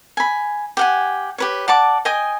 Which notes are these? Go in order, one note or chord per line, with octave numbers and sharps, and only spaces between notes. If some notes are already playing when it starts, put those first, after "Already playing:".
G#5 B5
G4 F#5 G#5
G4 B4 C#5
D5 F#5 A5 D6
D#5 G5 G#5 D#6